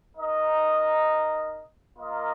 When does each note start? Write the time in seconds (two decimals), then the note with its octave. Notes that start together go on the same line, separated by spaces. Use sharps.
0.17 D#4 A#4 D#5
1.98 A#3 F4 A#4 D#5